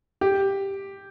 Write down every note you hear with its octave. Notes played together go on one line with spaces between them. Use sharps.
G4